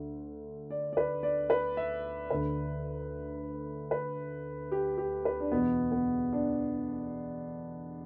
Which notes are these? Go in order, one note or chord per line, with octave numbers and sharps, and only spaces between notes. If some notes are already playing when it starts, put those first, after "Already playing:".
Already playing: D2 D3
D5
D5
B4
D5
B4
E5
D2 D3 B4
B4
G4
G4
B4
D4
E2 B2 B3
B3
D4